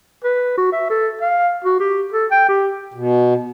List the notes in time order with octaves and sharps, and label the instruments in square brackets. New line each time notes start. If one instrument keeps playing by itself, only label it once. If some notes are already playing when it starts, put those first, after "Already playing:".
[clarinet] B4
F#4
E5
A4
F5
F#4
G4
A4
G5
G4
[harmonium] B2